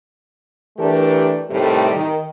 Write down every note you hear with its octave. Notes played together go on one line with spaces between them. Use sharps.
E3 A3 D4 G4 A#4
A2 C3 D#3 G3 A3
D#3